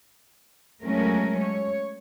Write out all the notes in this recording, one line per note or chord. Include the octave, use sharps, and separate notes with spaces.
F#3 G#3 A3 C#4 A#4
C#5